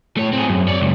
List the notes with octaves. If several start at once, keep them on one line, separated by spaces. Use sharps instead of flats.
A3 C#5
C4 G#4
F#2
C#5 D5
C#2 F#2